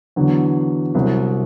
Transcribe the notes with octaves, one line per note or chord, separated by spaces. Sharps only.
E2 D3 F#3
C2 C3 F#3